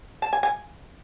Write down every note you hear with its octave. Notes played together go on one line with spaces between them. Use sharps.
A5
G#5
G#5